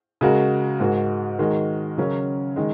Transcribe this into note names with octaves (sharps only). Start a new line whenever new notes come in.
C#3 G#3 F#4 A#4
G#2 G#3 F#4 A#4
D#3 G#3 F#4 A#4
C#3 F#3 C#4 F#4 A#4
D#3 G#3